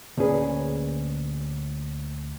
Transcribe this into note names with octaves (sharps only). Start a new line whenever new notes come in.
D2 A#2 C#4 G#4 B4